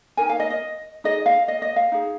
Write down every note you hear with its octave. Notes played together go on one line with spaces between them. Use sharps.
D#4 A#4 G#5
F5
D#5
D#5
D#4 G#4 D#5
F5
D#5
D#5
F5
D#4 G#4